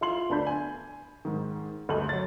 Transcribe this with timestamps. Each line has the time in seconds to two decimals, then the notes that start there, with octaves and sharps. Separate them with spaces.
0.01 E4 F4 C6 F#7
0.30 D2 B3 D4 B5 G6
0.47 G#5
1.25 G#2 D#3
1.89 D2 G2 A3 D#5 F#7
2.09 F#3 A6